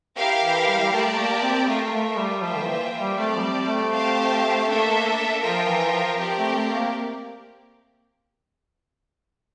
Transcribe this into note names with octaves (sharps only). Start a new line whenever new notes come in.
E4 G4 A#4 F5
E3
G3
G3
A3 G4 A#4 D5 A5
A#3
C4
A3 F4 A#4 E5
A3
G3
F3 A#3 F4 C5 E5 G5
D3
E3
G3
A3 C4 G4 D5 A5
F3
G3
A3
C4 G4 C5 F5 A5
A#3 D4 A4 E5
F3 F4 A#4 E5 G5
E3
F3
C4 G4 A#4 D5
A3
A3
A#3